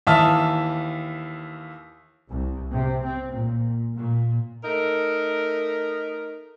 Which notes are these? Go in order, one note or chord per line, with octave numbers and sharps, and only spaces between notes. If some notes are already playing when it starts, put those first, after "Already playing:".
D#2 E3 E5 A5 D#6 F6
C2
C3
C4
A#2
A#2
A3 D#4 A#4